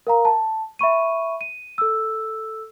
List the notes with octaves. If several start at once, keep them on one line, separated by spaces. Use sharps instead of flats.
A#4 F5 A#5
A5
E5 B5 C#6 D#7
D#7
A4 E6